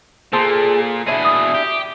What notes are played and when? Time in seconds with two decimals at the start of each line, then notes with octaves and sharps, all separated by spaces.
0.33 A#2 G#4 A4 C5
1.08 B2 D4 E4 G#4
1.25 D#6
1.55 G4